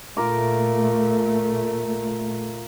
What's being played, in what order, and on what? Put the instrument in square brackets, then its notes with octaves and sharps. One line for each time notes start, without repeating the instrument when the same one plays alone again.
[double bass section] A#2 A3 [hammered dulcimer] F4 A#4 D6